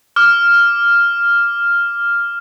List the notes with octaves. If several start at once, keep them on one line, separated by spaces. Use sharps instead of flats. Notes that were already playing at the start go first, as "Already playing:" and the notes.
D6 F6